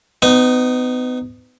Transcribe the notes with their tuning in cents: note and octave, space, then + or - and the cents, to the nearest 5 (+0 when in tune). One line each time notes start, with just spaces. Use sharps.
B3 +35 D#4 -10